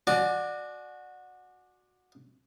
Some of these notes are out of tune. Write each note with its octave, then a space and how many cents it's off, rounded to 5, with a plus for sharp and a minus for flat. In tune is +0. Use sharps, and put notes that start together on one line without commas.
F#4 -15 D5 +20 G#5 +35